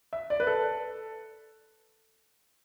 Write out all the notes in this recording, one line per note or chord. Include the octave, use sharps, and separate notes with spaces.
E5
D5
B4
A4